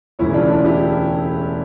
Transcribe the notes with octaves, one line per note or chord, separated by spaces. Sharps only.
E1 D2 C#3 E3 C#4 E4
D4 F4
D4 F4
E4 G4